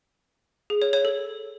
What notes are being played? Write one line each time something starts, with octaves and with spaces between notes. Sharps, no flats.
G#4
C#5
C#5
A4